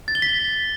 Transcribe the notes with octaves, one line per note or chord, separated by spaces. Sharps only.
A6
G7
B6